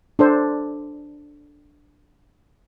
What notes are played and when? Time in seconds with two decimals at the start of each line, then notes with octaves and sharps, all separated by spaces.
0.19 D4 A4 C5